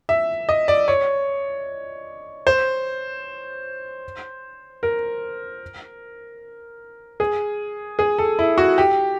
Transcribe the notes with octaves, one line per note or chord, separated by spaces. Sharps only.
E5
D#5
D5
C#5
C5
A#4
G#4
G#4
A4
E4
F#4
G4